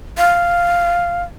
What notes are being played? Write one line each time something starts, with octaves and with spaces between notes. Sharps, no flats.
F5